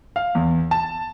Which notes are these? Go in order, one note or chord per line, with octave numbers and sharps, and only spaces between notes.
F5
E2
A5